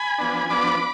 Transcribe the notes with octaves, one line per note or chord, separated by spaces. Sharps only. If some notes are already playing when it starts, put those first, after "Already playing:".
Already playing: G#5 B5
F3 B3 D4
F3 B3 D4 B5 D6